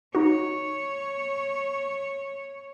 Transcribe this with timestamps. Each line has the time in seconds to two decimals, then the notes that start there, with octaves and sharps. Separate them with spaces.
0.15 D#4 F#4 C#5